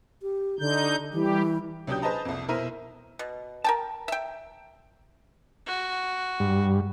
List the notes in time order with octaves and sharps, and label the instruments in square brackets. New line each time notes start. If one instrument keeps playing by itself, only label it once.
[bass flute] G4
[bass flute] D3 [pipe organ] D#4 G6
[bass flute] E3 [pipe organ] G3 G4
[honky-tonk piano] C#2 F#3 D4 G4 D#6 G6
G#4 B4 C5 D#5 A5 A#5
C2 F2
B2 E4 A#4 C5 F6 D#7
[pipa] B2
A#4 G5 A5
E5 G5
[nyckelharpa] F#4
[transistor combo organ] G2